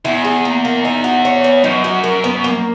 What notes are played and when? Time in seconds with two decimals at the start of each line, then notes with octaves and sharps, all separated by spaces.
0.05 E2 E4
0.25 G#4
0.45 A#3
0.65 A#3
0.85 D#4
1.04 F#4
1.25 C#5
1.44 B3
1.64 F#2 D#4
1.84 F#4
2.04 A#4
2.24 B3
2.44 A#3